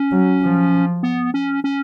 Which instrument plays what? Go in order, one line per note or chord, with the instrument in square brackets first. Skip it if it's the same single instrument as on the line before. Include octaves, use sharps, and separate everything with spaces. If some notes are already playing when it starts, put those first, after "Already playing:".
Already playing: [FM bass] C#4
[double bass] F#3
F3
[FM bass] B3
C#4
C#4